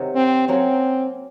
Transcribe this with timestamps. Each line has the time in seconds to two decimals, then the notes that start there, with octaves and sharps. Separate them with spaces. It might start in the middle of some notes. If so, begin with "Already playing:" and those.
Already playing: C3 D#3 F#3
0.15 C4
0.48 F#3 A#3 C4 C#4